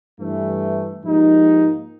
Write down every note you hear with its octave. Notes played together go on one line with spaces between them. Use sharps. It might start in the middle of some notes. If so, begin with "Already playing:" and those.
G2 E3 A3
G#2 F3 A#3 D#4 G4